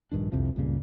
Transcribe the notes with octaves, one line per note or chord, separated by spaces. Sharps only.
A#1 G2 D#3 D4
C2 F2 C3 F3
C#2 G2 A#2 C#3